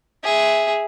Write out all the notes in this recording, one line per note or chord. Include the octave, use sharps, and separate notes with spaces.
G#4 E5